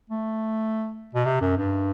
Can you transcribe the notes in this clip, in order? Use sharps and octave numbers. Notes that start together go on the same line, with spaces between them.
A3
B2
C3
F#2
G2